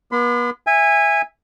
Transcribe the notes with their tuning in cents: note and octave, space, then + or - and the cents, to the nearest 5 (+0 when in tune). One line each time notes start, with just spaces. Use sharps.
B3 -40 B5 +45
E5 +0 G#5 -20